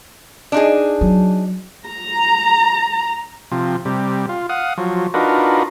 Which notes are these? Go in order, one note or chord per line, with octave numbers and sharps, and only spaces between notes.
D4 D#4 G#4
F#3
A#5
C3 F3
C3 G3
F4
F5 F#5 D#6
F3 F#3
D4 D#4 F4 F#4 A#4 B4